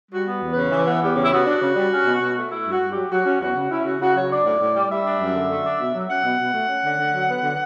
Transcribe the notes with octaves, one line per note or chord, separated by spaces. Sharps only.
G3 F#4
B3
E2
C#3 B4
E3
B3
E2 G4
C#3
E4
B3 F#4
D4
C#3
G3
C#4
B2
B2
A3
A3 E4
G2 F#4
G2
G4
F#3
F#3 F#4
C#4
E2 F#4
C#3
C#4 E4
C#3 F#4
C#3 F#4
F#3 C#5
D4 D5
A2
A2
G3
G3 E5
D4
F#2
D3
A3
D4
B2
F#3
C#4 F#5
B2
B2
A3
C#4
D3
D3
F#3
B3
D3